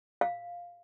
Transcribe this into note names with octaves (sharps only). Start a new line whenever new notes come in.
F5